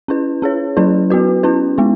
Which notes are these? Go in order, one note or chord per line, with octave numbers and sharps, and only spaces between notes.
C#4 E4 B4
C#4 G#4 C#5
F#3 C#4 E4 B4
B3 F#4 B4
C#4 E4 B4
G#3 B3 E4